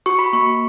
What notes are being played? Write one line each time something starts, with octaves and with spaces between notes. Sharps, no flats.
F#4 C#6
B5
A#3 C#6